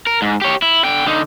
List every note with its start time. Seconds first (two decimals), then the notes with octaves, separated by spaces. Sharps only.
0.07 A#4
0.22 G#2
0.41 G4 C#5
0.62 E4
0.85 D3 G5
1.06 D3 D#4